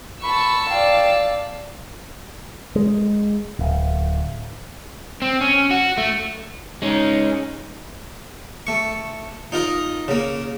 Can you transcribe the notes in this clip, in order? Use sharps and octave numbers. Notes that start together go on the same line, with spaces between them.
A5 B5 C#6 E6
D5 F5 G5
G#3
D1
C4
C#4
F#4
A3
G#3 C#4 D#4
A3 C#6
D#4 F4 A#4 D#5
C#3 A#3